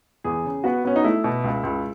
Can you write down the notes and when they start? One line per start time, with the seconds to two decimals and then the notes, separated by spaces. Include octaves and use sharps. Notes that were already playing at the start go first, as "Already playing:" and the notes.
0.24 E2 G#4
0.44 C#3
0.64 B3 F#4
0.85 B3 C#4
0.96 D#4
1.04 A3 E4
1.24 B2
1.44 C#2
1.63 C#2